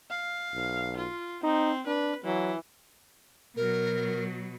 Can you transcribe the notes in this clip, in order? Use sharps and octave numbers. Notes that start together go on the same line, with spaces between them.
F5
B1
F4
C4 D#4
D4 B4
E3 F#3
B2 F#3 A#4